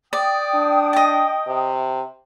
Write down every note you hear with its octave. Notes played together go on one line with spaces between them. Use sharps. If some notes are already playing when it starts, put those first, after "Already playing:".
D5 G5 D#6
D4
D#5 A5
C3